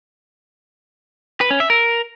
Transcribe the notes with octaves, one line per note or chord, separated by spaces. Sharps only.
B4
C#4
E5
A#4